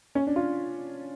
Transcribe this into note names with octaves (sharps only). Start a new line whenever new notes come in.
C#4
D4
F4